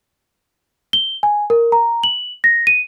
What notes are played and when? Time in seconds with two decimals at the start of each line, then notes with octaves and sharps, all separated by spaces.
0.93 G7
1.23 G#5
1.50 A#4
1.72 A#5
2.04 F#7
2.44 A#6
2.67 D#7